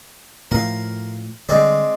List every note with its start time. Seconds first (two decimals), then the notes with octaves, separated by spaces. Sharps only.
0.51 A2 F3 A#4 F5
1.49 D3 G3 G#3 C4 D5